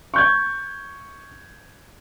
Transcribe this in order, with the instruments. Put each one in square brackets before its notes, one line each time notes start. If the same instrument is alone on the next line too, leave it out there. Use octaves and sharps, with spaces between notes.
[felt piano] C#6 G6 G#6